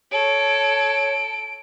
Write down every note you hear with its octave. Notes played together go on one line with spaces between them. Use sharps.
A4 C#5 D7